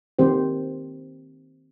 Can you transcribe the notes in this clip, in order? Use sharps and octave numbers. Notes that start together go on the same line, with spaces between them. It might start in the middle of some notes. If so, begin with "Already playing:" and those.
D#3 C4 G4 C5